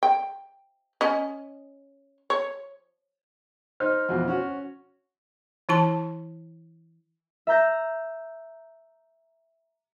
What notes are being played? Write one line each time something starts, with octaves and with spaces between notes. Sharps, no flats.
G5
C#4 D#5
C#5
D#4 C5 F6
F2 B2 E3
C#4 F#4
E3 E4 A5
E5 A#5 G6 A#6